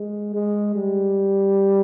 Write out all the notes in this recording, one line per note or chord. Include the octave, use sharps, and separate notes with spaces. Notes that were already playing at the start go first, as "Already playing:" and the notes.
Already playing: G#3
G#3
G3